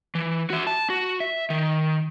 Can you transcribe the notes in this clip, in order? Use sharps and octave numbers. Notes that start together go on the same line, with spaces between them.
E3
F#4 E5
A5
F#4
E5
D#3